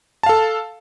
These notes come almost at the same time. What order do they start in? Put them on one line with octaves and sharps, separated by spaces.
A5 F5 A4